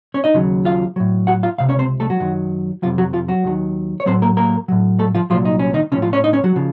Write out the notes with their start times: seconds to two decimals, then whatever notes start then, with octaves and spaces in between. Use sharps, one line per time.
0.14 C#4 C#5
0.24 D#4 D#5
0.34 D#2 C#3 F#3
0.65 F4 F5
0.96 A2 F#3
1.27 F#4 F#5
1.43 F4 F5
1.58 C#2 C3 F5
1.69 C#4 C#5
1.79 C4 C5
2.00 A3 A4
2.10 F#3 F#4
2.20 F#2 D#3 F#3
2.82 F2 C3 F3 F#3 F4
2.98 F#3 F#4
3.13 F3 F4
3.28 F#3 F#4
3.44 D#2 D#3 F#3
4.00 C#5
4.06 A2 F#3 C4 C5
4.22 A#3 A#4
4.37 A#3 A#4
4.68 A2 F#3
4.99 A3 A4
5.15 F3 F4
5.30 C2 A#2 F3 F#3 F4
5.45 D#4
5.59 C#4
5.74 D#3 D#4
5.92 C#3 F3 C#4
5.97 A2
6.02 F3 F4
6.13 C#4 C#5
6.24 D#4 D#5
6.33 C#4 C#5
6.44 F#3 F#4
6.56 C#3 F3